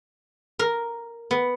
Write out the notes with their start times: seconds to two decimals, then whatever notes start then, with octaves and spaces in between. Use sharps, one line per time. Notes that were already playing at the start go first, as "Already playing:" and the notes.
0.59 A#4
1.31 B3